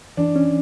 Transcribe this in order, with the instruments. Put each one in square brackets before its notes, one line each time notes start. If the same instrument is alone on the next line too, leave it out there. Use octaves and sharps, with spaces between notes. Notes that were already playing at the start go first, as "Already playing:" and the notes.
[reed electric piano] E3 [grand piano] D4
[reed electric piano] C#4